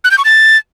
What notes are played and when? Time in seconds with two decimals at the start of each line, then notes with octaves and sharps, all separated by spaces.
0.04 F#6
0.11 G6
0.18 C#6
0.25 A6